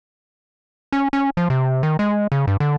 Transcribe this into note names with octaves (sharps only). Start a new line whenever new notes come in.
C#4
C#4
F3
C3
D#3
G#3
C#3
G2
D3